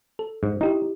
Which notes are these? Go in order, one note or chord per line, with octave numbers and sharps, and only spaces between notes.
A4
G#2
D#4 E4 G4